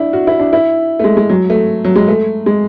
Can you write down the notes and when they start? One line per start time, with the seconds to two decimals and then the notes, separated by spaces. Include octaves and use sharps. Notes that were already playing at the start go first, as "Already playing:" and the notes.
Already playing: D4 E4
0.13 F#4
0.27 E4
0.39 D4
0.53 E4
0.99 A3
1.04 G#3
1.17 G#3
1.29 F#3
1.50 A3
1.84 F#3
1.96 G#3
2.08 A3
2.46 G#3